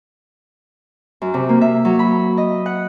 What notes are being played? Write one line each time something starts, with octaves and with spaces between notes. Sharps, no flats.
F#2
C3
A#3
E5
F#3
B5
D#5
F#5